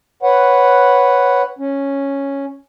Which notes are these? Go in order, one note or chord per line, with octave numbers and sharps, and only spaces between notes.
B4 C#5 F#5
C#4